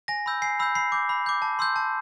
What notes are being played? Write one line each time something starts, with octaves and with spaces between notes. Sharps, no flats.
G#5 A#6
B5 E6 G6
G#5 C7
B5 E6 G6
B5 C7
D6 G6
B5
D6 G6
A5
C6 E6 G6
A5